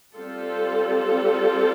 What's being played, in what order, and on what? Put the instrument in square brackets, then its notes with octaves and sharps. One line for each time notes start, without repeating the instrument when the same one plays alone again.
[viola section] G3 C4 F4 A4